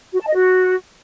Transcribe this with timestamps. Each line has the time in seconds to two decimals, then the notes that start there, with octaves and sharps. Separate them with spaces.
0.13 F#4
0.20 A5
0.27 D#5
0.34 F#4